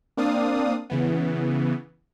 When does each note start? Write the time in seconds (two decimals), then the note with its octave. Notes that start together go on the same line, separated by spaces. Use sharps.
0.17 A#3 C4 D4 D5 F5 D#6
0.90 C#3 E3 B3